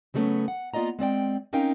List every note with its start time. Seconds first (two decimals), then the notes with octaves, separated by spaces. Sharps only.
0.14 C#3 F#3 G3 A3 B3 C#4
0.48 F#5
0.74 A#3 B3 F4 D5 D#5 A#5
0.99 G#3 C4 D5 G5
1.53 C4 C#4 D#4 A#4 F5 G5